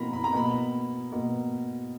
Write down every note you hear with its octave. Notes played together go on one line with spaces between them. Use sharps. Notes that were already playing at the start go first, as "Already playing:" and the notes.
Already playing: B2 A#3 A#5 B5
B5
A#5
B2 A#3 B5
B2 A#3